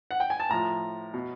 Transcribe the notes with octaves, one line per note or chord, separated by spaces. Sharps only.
F#5
G5
G#5
A5
A2 F3 A#5
B2